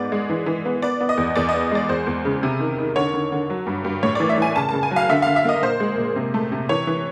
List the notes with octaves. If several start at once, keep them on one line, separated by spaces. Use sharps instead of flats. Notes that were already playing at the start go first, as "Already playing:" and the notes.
Already playing: G#2 B3 D5
G#3
E3
E3
B3
B3 D5
B3
D#5
E2
E2 D5
D#5
B3
G#3 D5
E2 C5
E2
C#3
C3
D#3
D#3
D3 C#5
D3
D3
F#3
G2
G2
A2 C#5
D5
E3
E5
E3 G#5
C#3 A5
A5
C#3
G#5
F#3
F5
D3 E5
D3 F5
E5
A#3 D#5
A#2 C5
G#3
A#2
C3
A3
C3
E3 C#5
E3